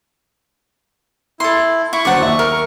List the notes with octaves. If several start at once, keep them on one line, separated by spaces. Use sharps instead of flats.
E4 A4 C6
E4 C#6
D3 F#3 C5 D5 F#5
D#2 E5
A#4